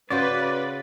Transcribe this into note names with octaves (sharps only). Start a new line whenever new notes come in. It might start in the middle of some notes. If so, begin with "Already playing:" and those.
C#3 F#4 B4 C5 D5